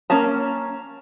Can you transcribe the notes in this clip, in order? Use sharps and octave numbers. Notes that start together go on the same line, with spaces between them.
A#3 C#4 A5 A#5